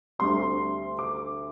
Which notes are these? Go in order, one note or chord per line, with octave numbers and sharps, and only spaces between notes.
D2 D3 G3 C4 C6
D6